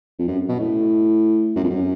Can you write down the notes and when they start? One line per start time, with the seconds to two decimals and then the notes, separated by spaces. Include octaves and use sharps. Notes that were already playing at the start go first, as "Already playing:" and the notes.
0.19 F2
0.28 F#2
0.49 B2
0.60 A2
1.56 F#2
1.64 F2
1.70 F#2